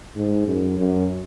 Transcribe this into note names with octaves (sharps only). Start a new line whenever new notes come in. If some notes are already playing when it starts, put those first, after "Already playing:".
G#2
F#2
F#2